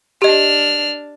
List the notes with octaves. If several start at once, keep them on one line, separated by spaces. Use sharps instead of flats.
D4 G4 D#5 F6